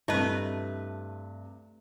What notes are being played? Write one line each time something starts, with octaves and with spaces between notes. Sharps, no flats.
G2 C3 A3 E4 B4 D#5 A5